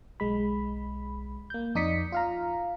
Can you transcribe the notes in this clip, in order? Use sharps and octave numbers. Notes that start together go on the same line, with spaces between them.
B1 G#3 B5
A#3 G6
F2 D#4 D5 D#6 B6 C#7
F4 F5 A#5